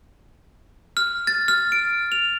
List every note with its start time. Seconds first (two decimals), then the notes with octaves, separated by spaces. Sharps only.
0.97 F6
1.27 A6
1.48 F6
1.72 D7
2.12 F7